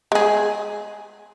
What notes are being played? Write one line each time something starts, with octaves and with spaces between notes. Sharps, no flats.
G#3 G#4